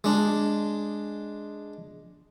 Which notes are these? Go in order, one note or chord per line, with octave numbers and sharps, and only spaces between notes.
G#3 D4